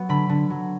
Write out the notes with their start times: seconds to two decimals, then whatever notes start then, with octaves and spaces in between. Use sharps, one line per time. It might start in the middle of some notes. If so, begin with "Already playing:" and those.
Already playing: F#3 B3
0.09 D3 B5
0.29 D3
0.50 F#3